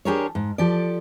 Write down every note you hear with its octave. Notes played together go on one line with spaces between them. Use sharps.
D4 G4 G#4 A#4 C5 C#5
G#2
F3 G4 A4 D5